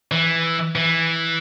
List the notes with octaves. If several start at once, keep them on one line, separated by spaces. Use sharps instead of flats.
E3
E3